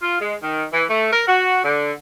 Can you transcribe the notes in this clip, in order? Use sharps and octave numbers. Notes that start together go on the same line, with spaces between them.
F4
G#3
D#3
E3
A3
A#4
F#4
D3